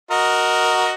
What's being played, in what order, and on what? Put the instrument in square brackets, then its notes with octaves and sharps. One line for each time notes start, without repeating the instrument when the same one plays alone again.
[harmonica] F#4 A#4 D#5